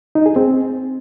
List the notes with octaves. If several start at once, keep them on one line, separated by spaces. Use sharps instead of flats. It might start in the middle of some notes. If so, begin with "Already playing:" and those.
D#4
G#4
C4